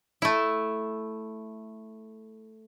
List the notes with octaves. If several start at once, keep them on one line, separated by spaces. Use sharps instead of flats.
A3 E4